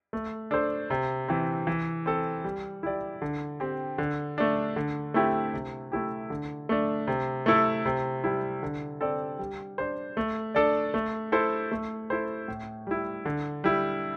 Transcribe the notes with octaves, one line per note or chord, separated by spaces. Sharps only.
A3
D4 A4 C5
C3
E3 C4
E3
C4 A4
G3
E4 G4 D5
D3
C4 G4
D3
A3 D4
D3
A3 C4 E4 G4
C3
A3 E4 G4
D3
A3 D4
C3
A3 E4 A4
C3
G3 E4
D3
C4 A4 D5
G3
D4 C5
A3
D4 A4 D5
A3
E4 A4 C5
A3
E4 A4 C5
A2
G3 E4
D3
G3 E4